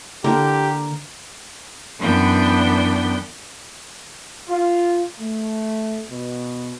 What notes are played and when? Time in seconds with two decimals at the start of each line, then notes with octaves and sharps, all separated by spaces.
0.24 D3 A#3 G4
1.99 F#2 E3 B3 D4 G5 G6
4.48 F4
5.19 A3
6.09 B2